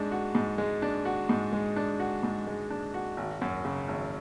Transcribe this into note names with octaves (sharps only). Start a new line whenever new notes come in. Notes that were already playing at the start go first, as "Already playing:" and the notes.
Already playing: G#2 G#3 D4
F#4
G#2
G#3
D4
F#4
G#2
G#3
D4
F#4
G#2
G#3
D4
F#4
G#1
F#2
C#3
G#1